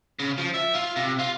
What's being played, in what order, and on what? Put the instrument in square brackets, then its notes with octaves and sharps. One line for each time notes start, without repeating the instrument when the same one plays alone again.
[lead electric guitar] C#3
F3
E5
F4
C3
F4